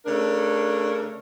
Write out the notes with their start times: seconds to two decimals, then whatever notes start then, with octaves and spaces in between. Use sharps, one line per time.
0.06 C#3 A3 D4 A#4